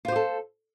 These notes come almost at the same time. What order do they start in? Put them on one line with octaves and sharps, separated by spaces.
F4 C5 G4 A4